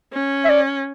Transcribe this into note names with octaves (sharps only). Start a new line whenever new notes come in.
C#4
E5
D5